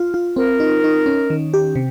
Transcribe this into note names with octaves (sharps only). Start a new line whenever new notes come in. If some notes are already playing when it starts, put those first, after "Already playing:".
Already playing: F4
F4
C4 A#4
D#4
D#4
C#4
D#3
G4
C3